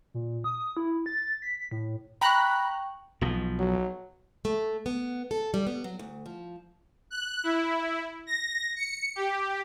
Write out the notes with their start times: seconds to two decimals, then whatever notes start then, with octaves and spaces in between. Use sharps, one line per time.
0.14 A#2
0.44 D#6
0.77 E4
1.06 A6
1.42 B6
1.71 A2
2.21 G5 A#5 B5 C#6 F#6
3.21 B1 B2 F3
3.59 F#3
4.45 A3
4.86 B3
5.31 A4
5.54 G3
5.67 B3
5.84 F#3
5.99 D2
6.26 F3
7.10 F#6
7.44 E4
8.27 A#6
8.76 C#7
9.16 G4